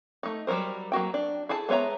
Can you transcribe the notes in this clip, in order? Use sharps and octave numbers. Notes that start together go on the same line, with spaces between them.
A3 D#4
F#3 G3 D#4 A#4 C5
F#3 A#3 F#4 G5
D4
E4 G#4 A4 A5
G#3 B3 C#5 E5 A#5